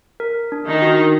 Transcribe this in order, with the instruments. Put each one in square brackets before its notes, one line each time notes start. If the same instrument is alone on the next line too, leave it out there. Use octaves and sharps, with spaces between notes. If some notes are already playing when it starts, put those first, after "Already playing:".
[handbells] A#4
D4
[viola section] D#3 D#4
[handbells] F#4